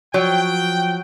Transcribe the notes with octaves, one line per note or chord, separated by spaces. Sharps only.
F3 F#3 G5